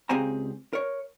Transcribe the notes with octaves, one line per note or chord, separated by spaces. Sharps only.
C#2 C4 G4 G#4 G#5 A#5
A#4 C#5